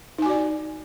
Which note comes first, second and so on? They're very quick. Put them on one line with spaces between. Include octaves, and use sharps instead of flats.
D#4 G#5 F#4 D5